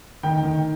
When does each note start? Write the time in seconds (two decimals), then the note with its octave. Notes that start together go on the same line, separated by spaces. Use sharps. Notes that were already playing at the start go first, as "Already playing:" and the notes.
0.23 D#3 G5
0.43 D#3